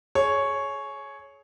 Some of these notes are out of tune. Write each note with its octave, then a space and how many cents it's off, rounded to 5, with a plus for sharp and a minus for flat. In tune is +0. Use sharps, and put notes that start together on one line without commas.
G#4 +30 C#5 +0